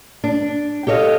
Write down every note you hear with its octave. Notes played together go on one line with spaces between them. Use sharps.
D4
G4 A4 C#5 D#5 F5